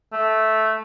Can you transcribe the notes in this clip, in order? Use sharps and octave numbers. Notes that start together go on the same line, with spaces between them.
A3